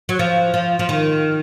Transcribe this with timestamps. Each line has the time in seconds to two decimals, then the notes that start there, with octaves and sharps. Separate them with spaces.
0.09 F#3
0.19 F3
0.54 F3
0.79 F3
0.89 D#3